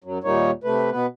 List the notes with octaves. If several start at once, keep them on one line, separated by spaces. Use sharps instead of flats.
F#2 F#3
D#2 A#2 G3 A#3 D#4 C#5
C3 A3 B4
B2 B3 B4